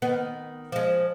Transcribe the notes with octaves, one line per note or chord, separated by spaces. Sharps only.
D#3 B3
F3 G#3